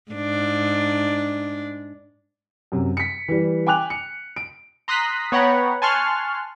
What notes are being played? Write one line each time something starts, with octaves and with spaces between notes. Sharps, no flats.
G#2 D4
F#2 C3
B6 C#7
E3 G3
G5 G#5 D6 F#6 F7
C#7
D7
A#5 C6 D#6 F#6 A#6 B6
B3 C#5 F#5 G5 A#5 B5
G#5 A5 C6 C#6 F6 F#6